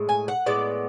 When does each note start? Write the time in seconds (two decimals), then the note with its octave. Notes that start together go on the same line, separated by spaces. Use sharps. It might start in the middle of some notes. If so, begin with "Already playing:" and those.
Already playing: A2 G#3
0.09 G#5
0.28 F#5
0.46 A2 G#3 B3 D5